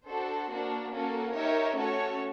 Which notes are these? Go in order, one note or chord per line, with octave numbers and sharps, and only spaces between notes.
D4 F#4 A4 C5
A#3 D4 F#4
A#3 C#4 F#4 A4
D#4 G4 A#4 C#5 E5
A3 C#4 F#4 A4 C#5